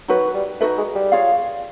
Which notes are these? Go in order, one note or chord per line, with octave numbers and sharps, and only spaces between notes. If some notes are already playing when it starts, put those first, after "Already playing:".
F#3 D#4 F#4 B4
G3
A3 D#4 F#4 B4
G#3
G3
F4 G#4 C#5 F5